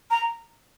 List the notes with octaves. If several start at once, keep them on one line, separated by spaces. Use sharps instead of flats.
A#5